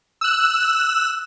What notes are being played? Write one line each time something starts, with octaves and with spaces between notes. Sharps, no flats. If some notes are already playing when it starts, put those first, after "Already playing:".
E6 F#6